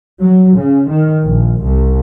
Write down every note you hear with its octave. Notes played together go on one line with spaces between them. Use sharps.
F#3
C#3
D#3
A#1
C2